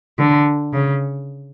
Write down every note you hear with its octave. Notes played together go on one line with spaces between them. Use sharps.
D3
C#3